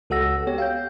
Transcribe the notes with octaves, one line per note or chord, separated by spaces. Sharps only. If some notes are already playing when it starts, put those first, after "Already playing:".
C#2 F#4 A4 F#5 E6 A#6
B3 G4 C#5 G5
F5 G5 G6